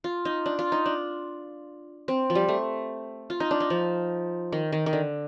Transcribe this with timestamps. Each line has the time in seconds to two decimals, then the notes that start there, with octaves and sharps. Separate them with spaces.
0.04 F4
0.25 D#4
0.46 D4
0.59 F4
0.72 D#4
0.86 D4
2.08 C4
2.30 F3
2.35 G3
2.48 A3
3.30 F4
3.40 D#4
3.51 D4
3.60 D#4
3.70 F3
4.52 D#3
4.72 D#3
4.86 D#3
4.93 D3